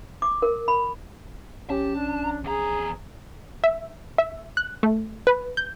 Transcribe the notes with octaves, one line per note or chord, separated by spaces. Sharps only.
D6
A#4
B5
A#1 C#4 G4 A5
D4
E2 G#4 A#5
E5
E5
F#6
A3
B4
G6